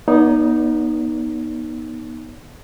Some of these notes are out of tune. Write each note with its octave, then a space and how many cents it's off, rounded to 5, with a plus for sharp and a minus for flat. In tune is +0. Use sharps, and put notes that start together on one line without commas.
B3 -30 D#4 +0 C#5 +45